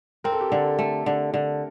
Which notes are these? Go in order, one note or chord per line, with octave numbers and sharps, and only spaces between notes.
C4 A#4
A4
G4
D3 A4
A3
D3
D3